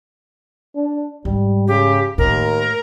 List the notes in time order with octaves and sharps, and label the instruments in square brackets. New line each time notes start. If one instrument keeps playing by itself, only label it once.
[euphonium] D4
[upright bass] G#2 [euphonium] G3
[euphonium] C#3 [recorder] G4
[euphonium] D#2 [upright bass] A2 [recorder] A#4